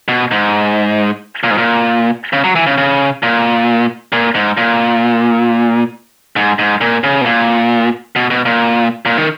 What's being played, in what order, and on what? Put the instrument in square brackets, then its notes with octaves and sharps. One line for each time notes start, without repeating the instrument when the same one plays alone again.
[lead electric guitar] B2
G#2
A#2
G#2
A#2
C#3
F#3
E3
C#3
C#3
A#2
A#2
G#2
A#2
G#2
G#2
A#2
C#3
B2
A#2
B2
B2
A#2
A#2
D#3